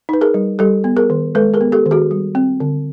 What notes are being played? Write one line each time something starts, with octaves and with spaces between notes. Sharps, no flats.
D#4 B4
G#4 A#4
G3
G3 G4 A4
B3
G#4 A#4
D#3
G#3 A4 B4
G#4 A#4
B3
G4 A4
D#3
F#4 G#4
G3
C4
D3